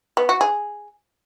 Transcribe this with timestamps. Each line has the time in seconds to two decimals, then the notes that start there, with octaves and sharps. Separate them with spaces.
0.17 B3
0.29 F#4
0.41 G#4